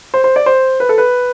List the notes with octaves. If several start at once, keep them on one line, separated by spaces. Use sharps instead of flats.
C5
C5
D5
C5
B4
A4
B4